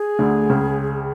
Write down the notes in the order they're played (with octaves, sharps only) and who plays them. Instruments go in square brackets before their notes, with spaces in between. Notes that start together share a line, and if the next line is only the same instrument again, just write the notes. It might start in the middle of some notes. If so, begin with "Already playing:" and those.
Already playing: [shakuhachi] G#4
[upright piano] D2 D3
C#2 C#3